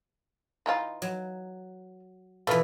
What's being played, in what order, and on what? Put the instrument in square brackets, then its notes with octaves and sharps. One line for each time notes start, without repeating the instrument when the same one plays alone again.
[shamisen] E3 D#4 F4
[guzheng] F#3
[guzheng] B2 E3 [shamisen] A3 F4 B4